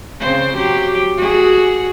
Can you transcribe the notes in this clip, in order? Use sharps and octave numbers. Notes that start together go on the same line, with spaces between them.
C#3 C4 C5
F#3 G4
F#4 G#4